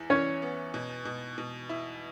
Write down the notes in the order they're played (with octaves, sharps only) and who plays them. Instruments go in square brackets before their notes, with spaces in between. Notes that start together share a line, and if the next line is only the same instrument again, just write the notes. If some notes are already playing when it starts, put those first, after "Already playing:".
Already playing: [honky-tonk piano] E2 E4
[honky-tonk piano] E3 [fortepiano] C#4 C#5
[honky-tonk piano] B3
B2
B2
B2
E4